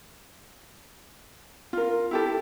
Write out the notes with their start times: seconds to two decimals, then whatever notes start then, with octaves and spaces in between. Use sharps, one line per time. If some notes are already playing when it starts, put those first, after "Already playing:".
1.73 F4 A#4
2.11 E4 G4 A4